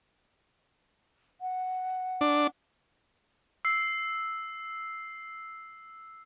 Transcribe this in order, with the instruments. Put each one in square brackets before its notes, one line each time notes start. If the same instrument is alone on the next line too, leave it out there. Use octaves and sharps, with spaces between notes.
[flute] F#5
[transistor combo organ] D4
[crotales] E6 C7